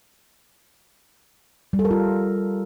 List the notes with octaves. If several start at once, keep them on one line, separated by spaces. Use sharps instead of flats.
G3
A4
A#4
F4